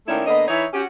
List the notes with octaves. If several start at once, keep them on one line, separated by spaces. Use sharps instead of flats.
D#3 A3 A#3 C#4 E4 D5
D3 A#3 B3 D#5
E3 D#4 E4 C#5
C#4 F#4 G4